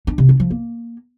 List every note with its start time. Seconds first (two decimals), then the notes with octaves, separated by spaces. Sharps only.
0.07 D4
0.18 C3
0.29 D4
0.40 F3
0.51 A#3